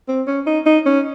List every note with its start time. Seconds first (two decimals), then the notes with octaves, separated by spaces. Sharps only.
0.08 C4
0.27 C#4
0.47 D#4
0.66 D#4
0.86 C#4